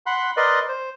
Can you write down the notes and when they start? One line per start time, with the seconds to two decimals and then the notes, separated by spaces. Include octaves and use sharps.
0.06 F#5 B5 C6 F#6
0.37 A#4 B4 D5 D#5 C6
0.68 C5